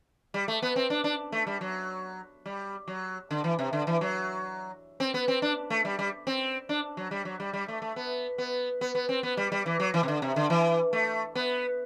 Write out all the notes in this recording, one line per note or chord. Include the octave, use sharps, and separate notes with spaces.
G3
A3
B3
C4
D4
D4
A3
G3
F#3
G3
F#3
D3
E3
C3
D3
E3
F#3
C4
B3
C4
D4
A3
G3
G3
C4
D4
F#3
G3
F#3
G3
G3
A3
A3
B3
B3
B3
B3
C4
B3
G3
G3
E3
F#3
E3
C3
D3
C3
D3
E3
A3
B3